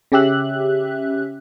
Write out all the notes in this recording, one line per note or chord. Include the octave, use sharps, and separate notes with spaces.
C#3 C#4 G4 E5 F#6